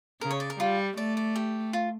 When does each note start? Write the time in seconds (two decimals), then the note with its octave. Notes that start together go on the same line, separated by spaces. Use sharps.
0.21 C#3 A#4
0.31 C#5
0.40 D5
0.50 A#4
0.59 G3 F4
0.97 A3 D5
1.17 D5
1.36 G4
1.73 F4